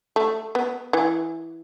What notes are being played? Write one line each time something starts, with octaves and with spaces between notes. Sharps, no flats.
A3
B3
E3